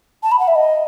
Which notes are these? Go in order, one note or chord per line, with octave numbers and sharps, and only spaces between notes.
A5
B5
F#5
E5
D#5